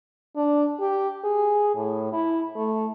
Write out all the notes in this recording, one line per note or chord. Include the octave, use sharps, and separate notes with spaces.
D4
G4
G#4
A2
E4
A3